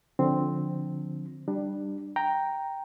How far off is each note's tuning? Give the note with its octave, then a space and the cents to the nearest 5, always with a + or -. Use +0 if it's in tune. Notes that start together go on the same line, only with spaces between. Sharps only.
D3 +0 F3 +20 C4 +0
G3 +0 D4 +20
G5 +0 A#5 +0